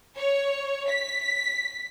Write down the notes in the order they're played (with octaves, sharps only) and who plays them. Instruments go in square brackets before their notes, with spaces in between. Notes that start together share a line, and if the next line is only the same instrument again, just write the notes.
[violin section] C#5
B6